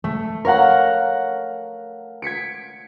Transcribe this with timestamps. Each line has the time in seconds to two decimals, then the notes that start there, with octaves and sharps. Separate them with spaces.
0.04 A3
0.45 A#4 C#5 F5 F#5 A#5
2.22 G#6 B6 C#7 D7